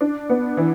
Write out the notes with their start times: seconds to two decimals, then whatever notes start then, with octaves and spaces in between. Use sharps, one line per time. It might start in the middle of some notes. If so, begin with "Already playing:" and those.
0.01 D4
0.29 B3
0.57 E3